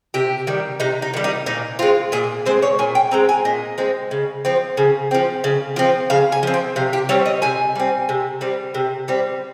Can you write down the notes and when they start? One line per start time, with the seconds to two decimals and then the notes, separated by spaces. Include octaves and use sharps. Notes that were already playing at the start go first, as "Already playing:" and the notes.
0.14 C3 G4
0.47 D#3 G3
0.80 C3 D#4
1.02 D#4
1.14 D#3 G3
1.24 D#4
1.46 A#2 D#4
1.79 G#3 C4 F4
2.12 A#2 G#4
2.46 G#3 C4 C5
2.62 C#5
2.79 A#2 G#5
2.95 G5
3.11 G#3 C4 A#5
3.29 G#5
3.45 A#2 D#5
3.78 G#3 C4
4.11 C#3
4.45 F3 C4
4.77 C#3
5.11 F3 C4
5.44 C#3
5.76 F3 C4
6.10 C#3 F5
6.32 G#5
6.43 F3 C4
6.54 G5
6.76 C3 F5
6.93 G4
7.09 G3 C4 C#5
7.26 D#5
7.42 C3 G#5
7.76 G3 C4
8.09 C3
8.41 G3 C4
8.74 C3
9.08 G3 C4